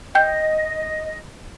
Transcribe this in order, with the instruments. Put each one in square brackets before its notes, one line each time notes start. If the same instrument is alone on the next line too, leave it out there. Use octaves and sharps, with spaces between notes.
[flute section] D#5 [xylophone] G5 G6